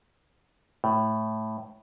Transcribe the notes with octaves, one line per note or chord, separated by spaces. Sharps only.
A2